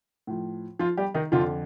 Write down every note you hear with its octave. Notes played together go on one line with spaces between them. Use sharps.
A2 F3
F3 F4
G3 G4
D#3 D#4
F2 D3 F3 F4